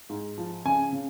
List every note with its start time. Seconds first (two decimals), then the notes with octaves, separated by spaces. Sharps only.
0.09 G#2
0.38 F3
0.65 C#3 G#5
0.92 C#3